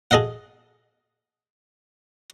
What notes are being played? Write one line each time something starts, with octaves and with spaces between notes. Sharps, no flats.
G#4 A4 D#5 F5 F#5